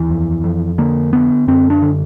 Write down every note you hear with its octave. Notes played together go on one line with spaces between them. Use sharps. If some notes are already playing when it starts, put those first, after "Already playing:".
Already playing: D#2 E3
F2
F2
D3 A#3
D3 B3
F#2 C4
D4
D3